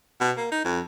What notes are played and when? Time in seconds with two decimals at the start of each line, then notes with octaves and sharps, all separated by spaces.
0.21 B2
0.38 A#3
0.52 D#4
0.65 F2